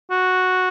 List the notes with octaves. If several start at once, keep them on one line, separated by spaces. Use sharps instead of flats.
F#4